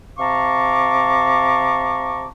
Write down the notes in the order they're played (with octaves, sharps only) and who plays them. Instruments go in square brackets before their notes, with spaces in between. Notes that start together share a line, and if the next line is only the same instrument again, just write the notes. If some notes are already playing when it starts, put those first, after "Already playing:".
[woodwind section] C3 F5 A5 A#5 C#6 D6